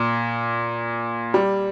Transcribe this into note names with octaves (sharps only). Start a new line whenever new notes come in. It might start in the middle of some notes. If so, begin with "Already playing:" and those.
Already playing: A#2
G3